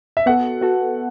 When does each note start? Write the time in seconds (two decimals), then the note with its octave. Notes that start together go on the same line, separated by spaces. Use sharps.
0.17 E5
0.26 B3 F#4 A4 F#5
0.61 B3 F#4 A4